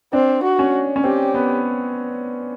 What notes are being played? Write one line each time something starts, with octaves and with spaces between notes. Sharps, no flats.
C4 D4
F#4
C#4
C#4
C4 G4
B3